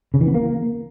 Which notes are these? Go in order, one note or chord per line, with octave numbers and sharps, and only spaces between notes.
C#3
E3
B3
A#3